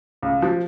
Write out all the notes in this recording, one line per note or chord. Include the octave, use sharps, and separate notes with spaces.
C#2
F3